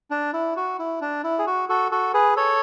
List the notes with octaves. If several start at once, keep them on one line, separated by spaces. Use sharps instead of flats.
D4
E4
F#4
E4
D4
E4
G#4
F#4
F#4 A4
F#4 A4
G#4 B4
A4 C#5